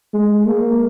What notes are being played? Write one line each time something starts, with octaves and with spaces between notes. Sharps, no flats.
G#3
A#3